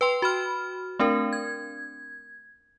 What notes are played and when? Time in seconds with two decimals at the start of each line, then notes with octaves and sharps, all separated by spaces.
0.01 B4 G5 C6
0.22 F#4 B5 F6
0.99 A3 C4 D4 A#4
1.33 G#6